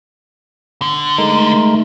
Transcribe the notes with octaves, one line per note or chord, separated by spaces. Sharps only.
D3
G#3 A3 D#4 A#4